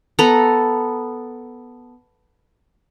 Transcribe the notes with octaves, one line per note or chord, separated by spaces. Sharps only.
B3 A4 A#5